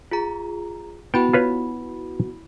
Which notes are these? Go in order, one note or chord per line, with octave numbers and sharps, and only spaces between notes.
F4 G#4 A#5
B3 E4 F#4 G5 B5
F4 B4 C#5